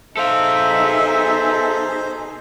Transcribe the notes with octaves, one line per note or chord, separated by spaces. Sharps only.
B2 D#4 G#4 A4 C5 E5 F5